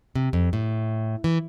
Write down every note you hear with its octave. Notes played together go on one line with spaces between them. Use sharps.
C3
F2
A2
E3